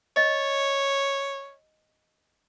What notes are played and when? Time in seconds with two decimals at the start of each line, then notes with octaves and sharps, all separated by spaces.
0.17 C#5 D#5